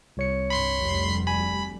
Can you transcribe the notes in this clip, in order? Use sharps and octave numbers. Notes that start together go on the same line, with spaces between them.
C2 C#5 C#7
G2 B5 C6 C7
F1 D2 G3
G#5 B5